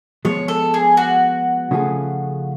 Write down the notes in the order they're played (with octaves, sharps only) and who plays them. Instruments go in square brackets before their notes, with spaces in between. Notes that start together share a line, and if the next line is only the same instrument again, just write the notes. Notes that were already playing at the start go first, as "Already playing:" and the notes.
[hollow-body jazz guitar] F3 G#3 B3 [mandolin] C#5
[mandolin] A4
G#4
F#4
[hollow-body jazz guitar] C#3 F3 A3 F4 G#4